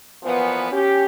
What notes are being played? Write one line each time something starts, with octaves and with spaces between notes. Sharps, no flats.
A#2 E3 F3 B3
C#4 G4